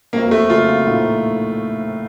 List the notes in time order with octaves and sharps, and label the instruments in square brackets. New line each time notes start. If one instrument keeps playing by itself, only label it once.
[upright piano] F2 C3 F3 C4 F#4 [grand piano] A#3
[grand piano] A3
[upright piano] F1 F2 C#3 F#3 [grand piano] F4
[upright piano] A#1 A2 F3 A3 D#4